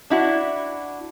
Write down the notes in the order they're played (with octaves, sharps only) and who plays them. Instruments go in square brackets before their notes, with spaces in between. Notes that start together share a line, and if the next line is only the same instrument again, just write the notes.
[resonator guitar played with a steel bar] D4 E4 F#4